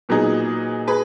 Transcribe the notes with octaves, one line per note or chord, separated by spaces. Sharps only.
A#2 F#3 B3 D#4 G#4
G#4 B4